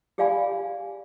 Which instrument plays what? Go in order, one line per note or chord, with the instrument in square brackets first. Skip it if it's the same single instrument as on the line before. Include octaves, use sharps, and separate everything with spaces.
[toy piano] G4 G#4 D5 F5 G#5 B5